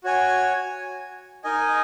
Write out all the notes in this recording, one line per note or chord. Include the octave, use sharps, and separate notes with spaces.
F#4 C#5 G#5
D#4 A#4 D#5 G#5